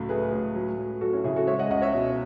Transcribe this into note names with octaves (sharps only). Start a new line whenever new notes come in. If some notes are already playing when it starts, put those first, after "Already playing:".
Already playing: C#2 A2 F#3
A3 G#4 B4
A2
F#3
F#3
F#3 F#4 A4
C#4 E4
C#3 E4 G#4
F#4 A4
G#3 C#5 E5
D#5 F#5
C#2 D#5 F#5
C#5 E5
B2